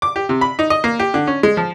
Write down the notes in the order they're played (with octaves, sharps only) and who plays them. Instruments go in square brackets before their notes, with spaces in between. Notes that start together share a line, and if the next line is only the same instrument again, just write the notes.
[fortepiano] D6
G4
C3
B5
D#4
D#5
A#3
G4
D3
C#4
G#3
F3